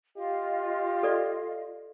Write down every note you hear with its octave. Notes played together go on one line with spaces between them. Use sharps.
F4 G4 D#5 F5
A4 D5